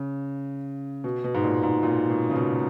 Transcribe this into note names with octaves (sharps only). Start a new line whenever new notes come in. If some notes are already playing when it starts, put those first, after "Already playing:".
Already playing: C#3
B2
B2
G#2
A#2
G#2
A#2
B2
C#3
B2